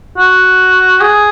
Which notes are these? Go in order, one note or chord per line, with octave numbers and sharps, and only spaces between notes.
F#4
G#4